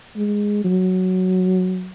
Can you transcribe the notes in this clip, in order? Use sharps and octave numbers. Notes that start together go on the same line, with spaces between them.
G#3
F#3